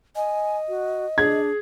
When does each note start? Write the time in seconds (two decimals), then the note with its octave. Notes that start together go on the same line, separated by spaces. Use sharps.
0.16 D#5 G#5
0.68 F#4
1.18 D4 G#4 G#6